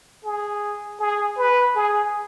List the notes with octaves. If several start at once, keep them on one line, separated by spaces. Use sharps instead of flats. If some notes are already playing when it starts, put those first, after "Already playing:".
G#4
G#4
B4
G#4